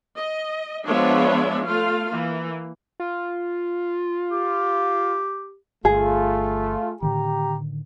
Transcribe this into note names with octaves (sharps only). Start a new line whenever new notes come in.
D#5
F3 G#3 B3 D4 C#5 E5
A3 F4 F5
E3 A#3
F4
G4
G1 A3 F4 G#4
A2 D3 D#3 G4 A#5